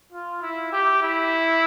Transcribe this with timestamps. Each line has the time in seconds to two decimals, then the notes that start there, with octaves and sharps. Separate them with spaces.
0.12 F4
0.42 E4
0.72 G4
1.02 E4